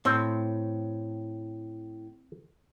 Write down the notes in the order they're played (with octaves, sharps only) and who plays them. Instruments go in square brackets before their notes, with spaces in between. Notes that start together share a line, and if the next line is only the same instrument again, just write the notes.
[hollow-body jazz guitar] A2 [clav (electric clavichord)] C4